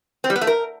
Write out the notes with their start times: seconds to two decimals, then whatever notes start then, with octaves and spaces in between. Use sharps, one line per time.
0.24 C4
0.30 G3
0.36 B3
0.41 A3
0.47 A#4